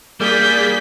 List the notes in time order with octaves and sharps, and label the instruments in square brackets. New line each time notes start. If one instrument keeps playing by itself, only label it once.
[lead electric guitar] G3 [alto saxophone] A#3 [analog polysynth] G#4 D5 [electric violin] G6 B6